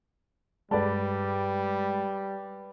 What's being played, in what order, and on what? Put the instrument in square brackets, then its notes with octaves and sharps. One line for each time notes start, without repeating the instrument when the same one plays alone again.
[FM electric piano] G2 G#3 [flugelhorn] G3 [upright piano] B4 D5 A5